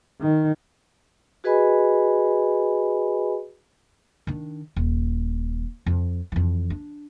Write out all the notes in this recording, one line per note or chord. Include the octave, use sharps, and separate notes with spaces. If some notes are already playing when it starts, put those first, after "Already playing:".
D#3
F#4 G#4 B4 D#5 G#5 B5
D#3 D4
D#1
F2
F2 E3
D4